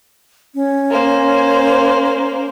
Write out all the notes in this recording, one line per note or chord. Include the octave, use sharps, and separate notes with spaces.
C#4
A#3 C5